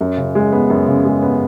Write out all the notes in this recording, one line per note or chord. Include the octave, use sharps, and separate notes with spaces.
F#2
C#3
G#3
B3
F#2
C#3
G#3
B3